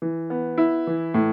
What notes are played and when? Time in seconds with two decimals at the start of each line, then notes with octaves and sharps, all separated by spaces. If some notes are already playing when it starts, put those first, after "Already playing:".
0.02 E3
0.30 B3
0.58 E4
0.87 E3
1.14 A2